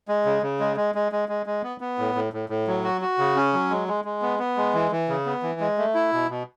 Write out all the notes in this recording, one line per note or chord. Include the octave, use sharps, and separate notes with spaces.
G#3
C#3
C#3
G#3
G#3
G#3
G#3
G#3
G#3
B3
B3
A2
A2
A2
A2
F#3
F#4
F#4
C#3
C#4
F#3
G#3
G#3
G#3
B3
B3
G#3
E3
E3
C#3
B3
E3
G#3
A3
E4
B2
B2